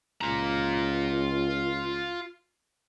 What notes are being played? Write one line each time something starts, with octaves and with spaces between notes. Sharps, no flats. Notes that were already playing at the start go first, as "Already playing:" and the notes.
C#2 F4 A#5